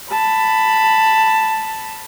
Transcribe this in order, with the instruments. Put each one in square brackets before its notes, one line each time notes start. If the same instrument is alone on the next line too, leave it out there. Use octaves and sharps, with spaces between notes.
[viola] A5 B5